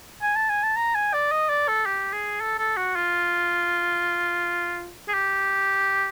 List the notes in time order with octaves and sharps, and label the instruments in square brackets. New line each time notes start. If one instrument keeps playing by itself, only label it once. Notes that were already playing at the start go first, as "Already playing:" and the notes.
[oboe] G#5
A5
G#5
A5
A#5
G#5
D5
D#5
D5
A4
G4
G#4
A4
A4
F#4
F4
G#4
G4